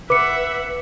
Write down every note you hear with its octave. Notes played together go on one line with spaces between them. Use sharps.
B4 E5 F#5 D6 C#7